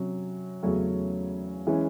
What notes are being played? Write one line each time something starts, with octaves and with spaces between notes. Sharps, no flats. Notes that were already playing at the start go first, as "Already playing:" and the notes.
Already playing: C3 F#3 C#4
E2 C#3 F#3 A3 C#4
E3 G#3 C#4